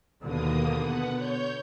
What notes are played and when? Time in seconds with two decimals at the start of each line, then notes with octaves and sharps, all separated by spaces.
0.23 D#2 B2 D3 A#3 D#6
0.81 B3 F#5
1.17 C#5 G6